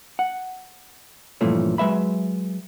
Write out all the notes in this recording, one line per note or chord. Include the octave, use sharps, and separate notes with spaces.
F#5
G2 A#2 E3 F3 A3 C#4
F#3 G#3 B4 E5 B5